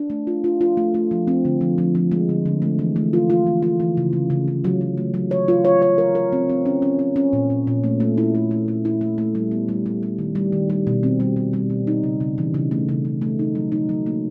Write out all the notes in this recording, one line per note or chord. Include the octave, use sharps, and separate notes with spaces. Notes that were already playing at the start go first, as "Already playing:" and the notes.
Already playing: D4
A3
F4
F4
F4
A3
A3
F3
C4
D3
F3
F3
F3
G#3
D3
D3
A3
E3
A3
F4
F4
E3
F4
E3
C#3
C#3
C#3
C#3
F#3
F#3
A3
F#3
C#5
F4
C#5
C#5
A#4
A#4
C4
C4
C#4
C#4
C#4
C#4
A#2
A#2
A#2
A3
A3
E4
A3
A3
A3
E4
A3
A3
G3
B3
G3
G3
G3
D#3
G3
D#3
G3
B2
C4
G3
G3
G3
B2
D#4
C#3
C#3
E3
C#3
A3
C#3
C#3
A3
D#4
F#3
D#4
F#3
A#3